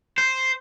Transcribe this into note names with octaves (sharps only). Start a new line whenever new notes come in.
C5